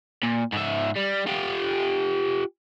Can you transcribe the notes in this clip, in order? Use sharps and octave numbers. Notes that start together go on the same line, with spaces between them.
A#2
G#2 E5
G3
F4 G4